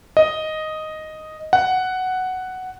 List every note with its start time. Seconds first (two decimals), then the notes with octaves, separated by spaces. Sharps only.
0.17 D#5
1.53 F#5